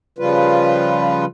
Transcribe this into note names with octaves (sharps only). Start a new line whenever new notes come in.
C#3 F3 G3 F4 B4